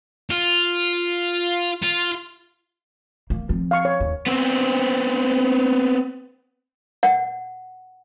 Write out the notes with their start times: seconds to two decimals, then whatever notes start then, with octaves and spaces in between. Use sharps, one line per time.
0.31 F4
1.82 F4
3.30 A#3
3.49 F3 C4
3.71 F5 C#6
3.85 C#5
4.00 D#2
4.26 B3 C4
7.03 F#5